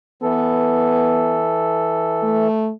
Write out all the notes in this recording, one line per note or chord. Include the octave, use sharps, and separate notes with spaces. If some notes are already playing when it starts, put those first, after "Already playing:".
E3 B3 A4
A3